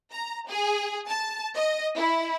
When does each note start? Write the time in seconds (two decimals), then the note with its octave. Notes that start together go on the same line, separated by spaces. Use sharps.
0.12 A#5
0.49 G#4
1.08 A5
1.56 D#5
1.95 E4